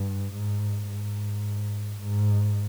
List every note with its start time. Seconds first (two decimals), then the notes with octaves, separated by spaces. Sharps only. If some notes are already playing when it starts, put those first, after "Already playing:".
Already playing: G2
0.33 G#2
0.88 G#2
2.01 G#2